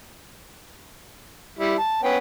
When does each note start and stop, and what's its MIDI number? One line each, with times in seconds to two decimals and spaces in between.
1.59 1.76 55
1.59 1.76 64
1.79 1.99 81
2.03 2.17 59
2.03 2.17 61
2.03 2.17 79